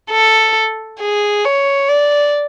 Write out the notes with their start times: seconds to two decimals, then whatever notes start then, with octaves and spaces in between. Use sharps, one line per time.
0.10 A4
1.00 G#4
1.45 C#5
1.88 D5